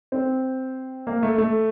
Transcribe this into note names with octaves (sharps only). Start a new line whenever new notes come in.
C4
A#3
A3
A3